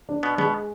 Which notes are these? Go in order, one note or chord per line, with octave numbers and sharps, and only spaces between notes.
D4
B2 B3
B2 G#3 B3